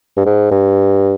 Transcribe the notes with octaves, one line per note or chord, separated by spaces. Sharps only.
G2
G#2
G2